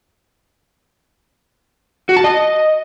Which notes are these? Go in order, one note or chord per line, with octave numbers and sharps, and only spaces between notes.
F#4
A5
D#5